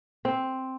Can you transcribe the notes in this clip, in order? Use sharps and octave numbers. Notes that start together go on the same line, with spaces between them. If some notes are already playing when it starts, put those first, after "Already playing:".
C4